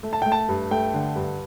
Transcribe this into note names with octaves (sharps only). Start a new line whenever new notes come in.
A3
A5
A3 G5
A5
G2
A3 G5
D3
G2